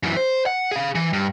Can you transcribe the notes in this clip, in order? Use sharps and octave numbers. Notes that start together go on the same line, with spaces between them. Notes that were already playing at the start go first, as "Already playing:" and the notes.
F#2 E3
C5
F#5
G#4 F5
E3
G2